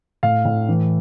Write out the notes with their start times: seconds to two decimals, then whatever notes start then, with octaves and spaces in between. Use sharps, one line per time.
0.23 A2 F5
0.45 A2
0.69 E3